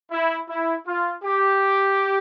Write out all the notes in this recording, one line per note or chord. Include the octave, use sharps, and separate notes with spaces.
E4
E4
F4
G4